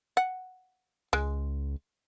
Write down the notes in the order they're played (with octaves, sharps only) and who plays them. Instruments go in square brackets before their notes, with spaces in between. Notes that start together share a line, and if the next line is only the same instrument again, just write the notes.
[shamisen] F#5
[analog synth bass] C#2 [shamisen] G#3